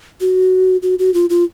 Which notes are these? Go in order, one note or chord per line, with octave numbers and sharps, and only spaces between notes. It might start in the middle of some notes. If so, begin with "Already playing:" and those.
F#4
F#4
F#4
F4
F4